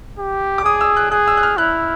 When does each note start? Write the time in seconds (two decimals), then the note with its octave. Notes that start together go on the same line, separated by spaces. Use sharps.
0.19 G4
0.58 D6
0.64 G#4 D#6
0.81 E6
0.97 F#6
1.11 G#4 F#6
1.28 E6
1.37 F#6
1.43 F6
1.58 E4 F#6